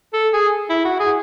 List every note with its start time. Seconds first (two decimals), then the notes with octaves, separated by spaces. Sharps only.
0.13 A4
0.33 G#4
0.70 E4
0.85 F#4
1.00 G#4